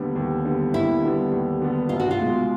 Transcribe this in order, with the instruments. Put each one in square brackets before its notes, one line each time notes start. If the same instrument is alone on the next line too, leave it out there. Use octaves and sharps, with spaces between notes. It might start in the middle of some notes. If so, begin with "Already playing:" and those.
Already playing: [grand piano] D#2 D3 G3 B3
D#2
D3 G3 B3
[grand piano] D#2 [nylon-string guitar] E4
[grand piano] D3 G3 B3
D#2
D3 G3 B3
[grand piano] C2 [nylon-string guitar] F4
[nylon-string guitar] F#4
F4
[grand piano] B2 G#3